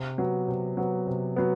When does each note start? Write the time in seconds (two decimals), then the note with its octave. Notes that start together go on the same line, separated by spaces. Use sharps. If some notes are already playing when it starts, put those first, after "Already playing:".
Already playing: C3
0.18 F#3 B3
0.48 C3
0.77 F#3 B3
1.07 C3
1.36 F#3 B3